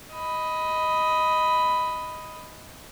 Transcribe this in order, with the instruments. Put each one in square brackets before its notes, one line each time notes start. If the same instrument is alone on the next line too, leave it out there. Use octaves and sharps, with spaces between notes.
[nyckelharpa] D#5 B5